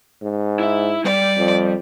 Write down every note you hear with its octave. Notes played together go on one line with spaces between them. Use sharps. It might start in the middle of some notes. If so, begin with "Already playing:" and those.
G#2
E4 E5
G3 D5
F2